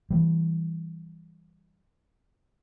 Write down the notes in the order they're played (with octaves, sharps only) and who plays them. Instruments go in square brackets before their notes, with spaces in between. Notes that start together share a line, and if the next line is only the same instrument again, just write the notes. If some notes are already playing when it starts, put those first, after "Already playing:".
[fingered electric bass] E3 G3